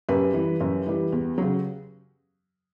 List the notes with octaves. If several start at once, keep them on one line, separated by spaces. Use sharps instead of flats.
F#2 G4 B4
E3 G3
F#2
E3 G3
E2
C#3 F#3